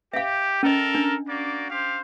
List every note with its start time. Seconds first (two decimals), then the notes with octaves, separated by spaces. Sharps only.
0.13 G4 E5 F5
0.63 C#4 A4 A#4 D#5
0.95 D4
1.27 A#3 F#4 D5
1.70 G4 C5 F5